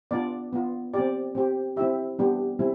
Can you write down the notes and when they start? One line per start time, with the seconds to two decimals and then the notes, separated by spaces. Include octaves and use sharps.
0.11 B3 D4 F4 D5
0.53 B3 F4
0.94 C4 G4 D5
1.35 C4 G4
1.77 C4 E4 G4 E5
2.19 G3 B3 D4 G4
2.59 G3 C4 E4